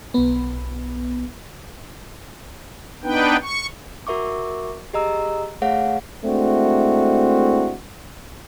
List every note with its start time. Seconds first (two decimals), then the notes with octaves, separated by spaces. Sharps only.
0.14 B1 B3
3.03 B3 D4 D#4 B4 G5
3.42 C#6
4.07 F#4 A#4 E5 C#6 D6
4.93 G4 G#4 D#5 A#5 E6
5.62 A3 G#4 C#5 F5 F#5
6.24 G#3 A3 C4 D4 E4 F#4